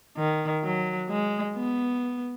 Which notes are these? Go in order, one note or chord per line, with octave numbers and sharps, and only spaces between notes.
D#3
F#3
G#3
B3